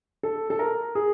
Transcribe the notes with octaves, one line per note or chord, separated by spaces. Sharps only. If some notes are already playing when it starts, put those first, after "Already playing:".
A4
A4
A#4
G#4